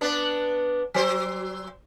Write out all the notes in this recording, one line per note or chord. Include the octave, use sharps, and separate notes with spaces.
B3 D4
F#3 C5